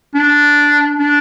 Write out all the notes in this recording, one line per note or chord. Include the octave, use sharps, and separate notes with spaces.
D4
D4